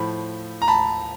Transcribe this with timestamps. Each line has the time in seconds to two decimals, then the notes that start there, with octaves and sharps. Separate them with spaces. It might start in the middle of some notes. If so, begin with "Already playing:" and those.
Already playing: A2 F3 B5
0.62 A#5
0.68 A5 B5